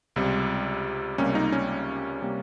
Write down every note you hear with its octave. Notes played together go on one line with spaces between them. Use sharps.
C#2 C3 G3
C#2 C3 G3 A#3 C#4
D#4
C#4
C3 G3 A#3